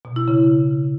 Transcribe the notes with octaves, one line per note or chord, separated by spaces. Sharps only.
B2
E4
C#3